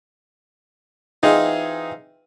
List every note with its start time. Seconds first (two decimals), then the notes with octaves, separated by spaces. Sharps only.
1.23 E3 C4 D#4 F4 G#4